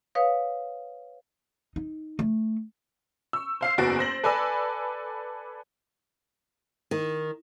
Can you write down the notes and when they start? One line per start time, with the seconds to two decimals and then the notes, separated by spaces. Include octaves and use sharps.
0.15 B4 C#5 F5 D#6
1.76 D#4
2.19 A3
3.33 C#6 E6
3.61 C5 F5 C7
3.78 F#1 E2 B3 F#4 A6 D7
3.99 C5 A#6 F#7
4.23 A4 B4 D5 G#5 B5 E6
6.91 D#3